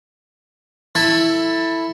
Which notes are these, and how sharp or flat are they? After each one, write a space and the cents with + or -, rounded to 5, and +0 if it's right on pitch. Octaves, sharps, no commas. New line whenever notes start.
E4 +0 A4 +10